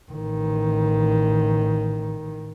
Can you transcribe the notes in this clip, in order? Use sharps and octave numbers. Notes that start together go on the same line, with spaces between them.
A1 D#3